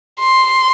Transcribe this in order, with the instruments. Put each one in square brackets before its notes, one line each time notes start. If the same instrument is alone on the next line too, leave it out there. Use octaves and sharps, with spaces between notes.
[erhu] C6